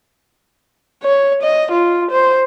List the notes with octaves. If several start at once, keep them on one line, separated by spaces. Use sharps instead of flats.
C#5
D#5
F4
C5